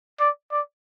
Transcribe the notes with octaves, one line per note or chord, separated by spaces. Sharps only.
D5
D5